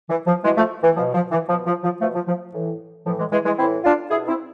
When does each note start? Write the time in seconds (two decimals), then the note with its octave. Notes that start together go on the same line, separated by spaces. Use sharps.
0.09 E3
0.27 F3
0.44 B2 E3 G#3
0.57 F3 A3
0.83 E3
0.96 B2 F3
1.14 F3
1.31 E3
1.49 B2 F3
1.66 F3
1.83 F3
2.01 B2 F3 A3
2.15 F3
2.27 F3
2.54 A2 E3
3.06 A2 E3 F3
3.19 E3 G#3
3.32 E3 G#3
3.45 E3 G#3
3.58 A2 E3 C4 E4
3.84 D4 F4
4.10 B2 E4 G#4
4.28 C4 E4